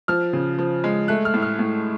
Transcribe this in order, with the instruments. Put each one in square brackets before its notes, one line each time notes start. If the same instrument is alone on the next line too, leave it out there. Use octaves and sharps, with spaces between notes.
[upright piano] F3 F6
C#3
F3
G#3
A3 F#6
F6
A2
F6
A2